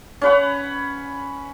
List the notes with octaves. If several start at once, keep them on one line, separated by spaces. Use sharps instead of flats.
C#4 B4 F#5